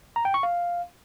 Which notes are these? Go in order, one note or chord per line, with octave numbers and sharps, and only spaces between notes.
A#5
G5
C#6
F5